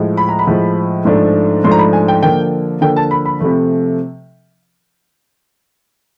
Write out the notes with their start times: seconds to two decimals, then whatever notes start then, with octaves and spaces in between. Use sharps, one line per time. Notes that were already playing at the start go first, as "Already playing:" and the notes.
Already playing: A2 F3 G#3
0.17 B5
0.29 A#5
0.39 B5
0.47 A2 F3 G#3
1.05 G#2 F3 A3 D4
1.64 G#2 F3 A3 D4 C6
1.72 A#5
1.78 B5
1.93 G#5
2.08 G5
2.23 D3 F3 A#3 G5
2.81 D3 F3 A#3 G5
2.96 A5
3.11 B5
3.25 B5
3.40 C3 F3 A3